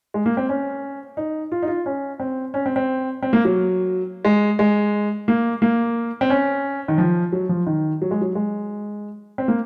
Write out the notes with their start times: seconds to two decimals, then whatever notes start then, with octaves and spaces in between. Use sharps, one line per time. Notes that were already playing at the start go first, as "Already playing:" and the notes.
0.14 G#3
0.26 A#3
0.37 C4
0.49 C#4
1.17 D#4
1.52 F4
1.62 D#4
1.68 F4
1.86 C#4
2.20 C4
2.54 C#4
2.66 C4
2.76 C4
3.23 C4
3.33 A#3
3.45 F#3
4.25 G#3
4.59 G#3
5.28 A#3
5.62 A#3
6.21 C4
6.30 C#4
6.88 D#3
6.98 F3
7.32 F#3
7.49 F3
7.67 D#3
8.02 F#3
8.11 G#3
8.21 F#3
8.35 G#3
9.38 C4
9.48 A#3